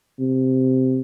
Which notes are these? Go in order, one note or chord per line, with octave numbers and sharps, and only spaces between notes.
C3